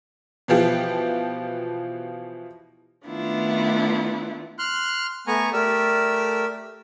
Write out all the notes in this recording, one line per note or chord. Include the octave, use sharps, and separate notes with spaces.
B2 E3 F3 G4
D#3 A3 B3 D4 E4 F4
C6 F6 F#6
A3 B3 G#5 A#5 C#6
A3 G4 A#4 D5 E6